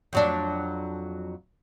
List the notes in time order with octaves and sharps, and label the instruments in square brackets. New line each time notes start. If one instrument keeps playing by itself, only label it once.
[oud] F2 F#3 D4